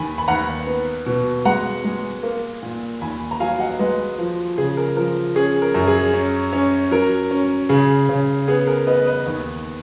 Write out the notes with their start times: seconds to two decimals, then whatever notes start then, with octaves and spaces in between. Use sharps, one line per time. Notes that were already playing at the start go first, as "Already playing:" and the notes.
Already playing: D#2 G#5 B5
0.18 B5
0.28 D#2 F#5 A#5
0.67 B3
1.06 B2
1.45 G#3 F#5 A#5
1.85 G#3
2.23 A#3
2.63 A#2
3.01 D#2 G#5 B5
3.31 A#5
3.40 F#3 F5 G#5
3.60 D#5 F#5
3.79 G#3 B4 D#5
4.18 F3
4.58 C#3 G#4
4.77 A#4
4.96 F3 A#4
5.35 C#4 G#4
5.62 A#4
5.74 F#2
5.88 G#4
6.14 C#4
6.53 C#4
6.91 F#3 A#4
7.31 C#4
7.69 C#3 G#4
8.09 C#3
8.48 B3 G#4
8.67 A#4
8.87 B3 B4 D#5
9.06 B4 D#5
9.26 D#2